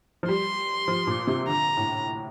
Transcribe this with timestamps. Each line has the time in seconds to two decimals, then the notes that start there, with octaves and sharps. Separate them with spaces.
0.23 F3
0.28 G3 C6
0.88 F3
1.07 A#2
1.27 C3
1.47 D3 A#5
1.77 A2